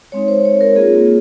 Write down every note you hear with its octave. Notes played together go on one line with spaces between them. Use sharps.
G#3 C4 D#4 C#5
C5
C#5
A#4
A#3 F4 G#4